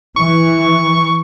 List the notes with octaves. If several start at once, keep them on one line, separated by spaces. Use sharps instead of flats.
E3 C#6